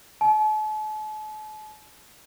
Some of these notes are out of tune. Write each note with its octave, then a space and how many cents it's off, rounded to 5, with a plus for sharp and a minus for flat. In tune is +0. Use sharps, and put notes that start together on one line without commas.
A5 -40